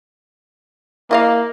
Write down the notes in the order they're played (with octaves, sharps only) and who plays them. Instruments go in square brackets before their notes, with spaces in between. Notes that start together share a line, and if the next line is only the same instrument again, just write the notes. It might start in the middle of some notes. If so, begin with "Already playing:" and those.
[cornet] A#3 [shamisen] E4 D#5 F5